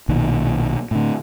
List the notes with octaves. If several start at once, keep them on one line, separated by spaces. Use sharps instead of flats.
B1 A#2 D#3
A2 D3